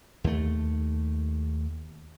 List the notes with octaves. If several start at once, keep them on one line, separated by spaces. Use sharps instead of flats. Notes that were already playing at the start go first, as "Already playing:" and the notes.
D#2 A3